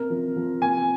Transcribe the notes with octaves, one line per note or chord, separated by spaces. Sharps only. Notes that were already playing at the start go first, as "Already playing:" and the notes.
Already playing: C3 A#4
F3
F3
C3 G#5